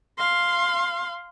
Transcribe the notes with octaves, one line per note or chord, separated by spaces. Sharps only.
F5 C6